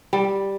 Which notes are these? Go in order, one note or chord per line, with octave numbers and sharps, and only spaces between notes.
G3